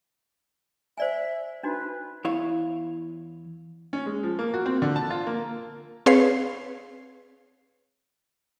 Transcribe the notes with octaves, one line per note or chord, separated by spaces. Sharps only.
C5 D5 E5 G#5
D4 D#4 F#4 B4
E2 E4 C#5 F5
C#4
G#3
F3
A#3
F#4
C4
D3
A5
F4
A#3
C4 G#4 B4 C#5 F5 C7